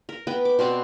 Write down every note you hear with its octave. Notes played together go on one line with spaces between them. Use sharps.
A#4
B3 B4 G5
D6
B2 C4 D5 A5